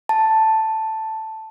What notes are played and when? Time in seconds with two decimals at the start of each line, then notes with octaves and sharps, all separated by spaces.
0.09 A5